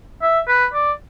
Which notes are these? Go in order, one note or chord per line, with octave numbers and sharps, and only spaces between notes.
E5
B4
D5